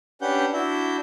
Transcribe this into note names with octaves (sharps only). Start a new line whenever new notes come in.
C#4 D4 G4 B4 F#5 G6
D4 E4 F#4 E5 G6